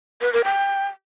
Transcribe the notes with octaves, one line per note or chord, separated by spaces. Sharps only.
B4
A#4
G5